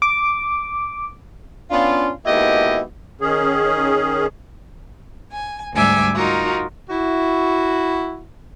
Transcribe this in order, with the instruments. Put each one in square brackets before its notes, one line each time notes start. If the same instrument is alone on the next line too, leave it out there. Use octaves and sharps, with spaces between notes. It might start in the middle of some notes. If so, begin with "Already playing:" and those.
[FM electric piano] D6
[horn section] B3 C#4 D4 F4
G#2 B2 A#3 E4 G4 D#5
[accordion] D#3 C#4 G#4
[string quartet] G#5
D2 G#2 G3 E5 G#5 D6
D#4 F4 F#4 A#4
[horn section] E4 F#4